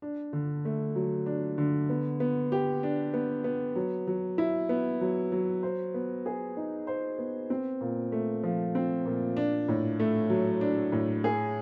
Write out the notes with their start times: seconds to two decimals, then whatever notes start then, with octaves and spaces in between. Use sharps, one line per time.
0.02 D4
0.33 D3
0.65 A3
0.95 F#3
1.26 D4
1.58 D3
1.89 B3
2.20 B3
2.52 G4
2.83 D4
3.14 B3
3.44 B3
3.75 F#3
4.07 F#3
4.38 E4
4.69 B3
5.01 F#3
5.32 F#3
5.63 C5
5.94 B3
6.26 G#4
6.57 D#4
6.87 C5
7.18 B3
7.50 C4
7.81 A#2
8.12 A3
8.43 F3
8.75 C4
9.06 A#2
9.37 D4
9.68 A2
10.00 A3
10.30 F#3
10.61 D4
10.92 A2
11.24 G#4